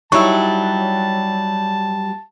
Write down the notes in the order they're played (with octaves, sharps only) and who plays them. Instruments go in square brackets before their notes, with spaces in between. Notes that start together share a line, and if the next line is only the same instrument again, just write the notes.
[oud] F#3 G3 [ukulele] D#4 E4 [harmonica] A5 [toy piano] C#6 E6